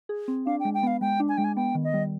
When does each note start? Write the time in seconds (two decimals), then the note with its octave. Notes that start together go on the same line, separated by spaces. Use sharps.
0.09 G#4
0.28 C4
0.46 D4 F5
0.60 G5
0.65 G#3
0.74 G5
0.83 B3 F5
1.01 G#3 G5
1.20 D4
1.29 G#5
1.37 G#3 G5
1.44 G#5
1.56 B3 G5
1.75 D#3
1.84 D#5
1.94 G3